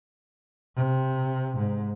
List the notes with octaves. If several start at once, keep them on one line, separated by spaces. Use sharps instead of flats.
C3
G#2